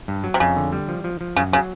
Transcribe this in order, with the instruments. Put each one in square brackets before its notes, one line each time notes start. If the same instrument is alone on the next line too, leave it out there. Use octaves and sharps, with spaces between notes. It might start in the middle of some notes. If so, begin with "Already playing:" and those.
[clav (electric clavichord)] G2
F#3
[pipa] C3
[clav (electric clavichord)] F2 [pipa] C#3
[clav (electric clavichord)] D3
G3
F3
F3
F3
[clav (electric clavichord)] F#2 [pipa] C#3
[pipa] C#3 [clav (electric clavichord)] F#3